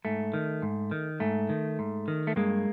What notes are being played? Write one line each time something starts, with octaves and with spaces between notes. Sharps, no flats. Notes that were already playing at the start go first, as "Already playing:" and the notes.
G#2 A3
D#3
G#2
D#3
G#2 A3
D#3
G#2
D#3
A3
G2 G#3 A#3